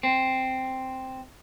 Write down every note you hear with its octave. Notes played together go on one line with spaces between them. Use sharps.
C4